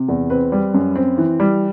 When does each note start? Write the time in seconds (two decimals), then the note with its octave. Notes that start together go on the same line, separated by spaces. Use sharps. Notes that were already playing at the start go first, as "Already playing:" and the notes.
Already playing: C3
0.08 E2
0.30 C4 B4
0.52 G3
0.74 F#2
0.96 C4
1.18 E3
1.40 G3